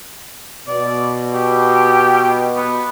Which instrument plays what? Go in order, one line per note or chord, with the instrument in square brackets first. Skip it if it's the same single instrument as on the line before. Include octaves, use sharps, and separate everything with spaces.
[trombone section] B2 [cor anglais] D5
[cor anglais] G4
B3